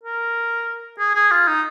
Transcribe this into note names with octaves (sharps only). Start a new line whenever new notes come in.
A#4
G#4
G#4
F4
D#4